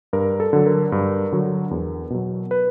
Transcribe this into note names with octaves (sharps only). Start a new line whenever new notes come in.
G2 A#4
A4
D3 F#3
A#4
G2
D3 F#3
E2
B2 F#3
B4